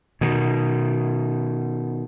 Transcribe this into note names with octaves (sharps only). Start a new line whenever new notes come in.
B2 D#3